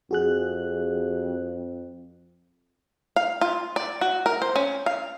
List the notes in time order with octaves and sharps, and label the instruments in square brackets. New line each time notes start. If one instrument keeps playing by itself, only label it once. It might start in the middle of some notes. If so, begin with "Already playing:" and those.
[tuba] F2 [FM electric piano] F#4 G#4 F#6
[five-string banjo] F5
F4
D5
F#4
A#4
C5
C#4
F5